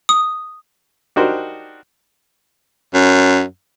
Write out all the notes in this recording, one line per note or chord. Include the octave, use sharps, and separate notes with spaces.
D#6
D4 D#4 F#4 G4 A#4 C5
F#2